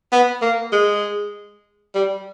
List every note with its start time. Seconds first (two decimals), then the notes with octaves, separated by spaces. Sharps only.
0.12 B3
0.42 A#3
0.72 G#3
1.95 G3